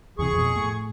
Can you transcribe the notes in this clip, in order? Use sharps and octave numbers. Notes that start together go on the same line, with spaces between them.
E2 C3 G#4 C#6
F2 B2
A2